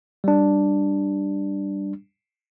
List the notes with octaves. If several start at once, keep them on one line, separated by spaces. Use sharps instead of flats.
G3 D4